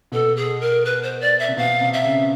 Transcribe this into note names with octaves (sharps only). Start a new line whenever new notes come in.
B2 A4
G#4
A#4
B4
C5
D5
E5
C3
B2 F5
C3
E5
C#3